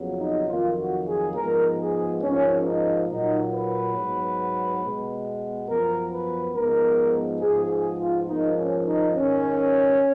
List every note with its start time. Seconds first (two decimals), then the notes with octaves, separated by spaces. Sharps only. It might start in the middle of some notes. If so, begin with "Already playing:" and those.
Already playing: F2 C#3 F#3 B3
0.20 D#4
0.48 F2 D#3 F#3 A#3 F4
0.78 F#4
1.06 G#4
1.35 G#2 F3 G#3 B3 A#4
1.78 G#4
2.21 G#2 F3 A#3 C#4
2.64 D#4
3.08 A#2 F#3 A#3 D#4
3.52 B4
3.94 G#2 F#3 B3
4.82 B2 G#3 B3
5.68 F#2 F3 B3 A#4
6.12 B4
6.54 G#2 F3 G#3 B3 A#4
7.41 G#2 F3 B3 G#4
7.70 G#4
7.99 F4
8.27 G#2 F3 A#3 D#4
8.56 C#4
8.85 D#4
9.15 G#2 D#3 A#3 C#4